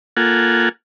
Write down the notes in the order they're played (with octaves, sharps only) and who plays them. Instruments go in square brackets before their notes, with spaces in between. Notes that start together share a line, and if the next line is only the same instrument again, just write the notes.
[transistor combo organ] A#3 F4 A4 F#5 G#5